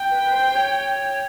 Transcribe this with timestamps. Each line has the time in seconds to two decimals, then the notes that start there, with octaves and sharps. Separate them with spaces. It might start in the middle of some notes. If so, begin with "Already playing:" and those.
Already playing: G5
0.10 B4
0.25 B4
0.32 C5
0.51 C5
0.55 C#5